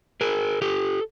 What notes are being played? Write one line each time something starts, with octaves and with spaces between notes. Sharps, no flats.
G#4 A#4
G4 A4